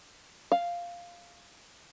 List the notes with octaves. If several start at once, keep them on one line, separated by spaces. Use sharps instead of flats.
F5